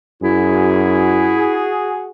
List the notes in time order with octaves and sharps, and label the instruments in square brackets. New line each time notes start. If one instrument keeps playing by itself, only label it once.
[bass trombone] F#2 [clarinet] E4 [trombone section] F#4 G#4